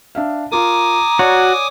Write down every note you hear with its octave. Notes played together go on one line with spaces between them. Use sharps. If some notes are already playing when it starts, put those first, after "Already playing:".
D4 E5 F5
F4 A#4 G#5 A#5 D6 D#6
F#4 C#5 D5